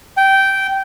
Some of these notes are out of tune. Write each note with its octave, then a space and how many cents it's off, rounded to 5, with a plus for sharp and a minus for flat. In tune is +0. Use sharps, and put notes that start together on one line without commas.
G5 -15